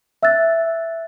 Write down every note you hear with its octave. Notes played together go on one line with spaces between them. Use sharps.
E5 E6 F#6 A6